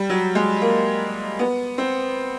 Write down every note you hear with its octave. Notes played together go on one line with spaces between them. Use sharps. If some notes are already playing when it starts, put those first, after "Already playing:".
Already playing: G3
F#3
G#3
A#3
B3
C4